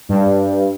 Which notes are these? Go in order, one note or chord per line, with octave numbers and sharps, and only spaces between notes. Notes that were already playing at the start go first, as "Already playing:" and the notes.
G2